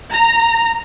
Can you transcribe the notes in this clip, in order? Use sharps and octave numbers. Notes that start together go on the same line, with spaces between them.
A#5